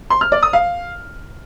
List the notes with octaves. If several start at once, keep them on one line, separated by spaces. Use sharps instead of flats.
C6
F6
D5
D#6
F5